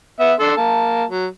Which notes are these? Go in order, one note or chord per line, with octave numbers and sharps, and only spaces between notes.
B3 E5
D4 A4 C6
A#3 A5
F#3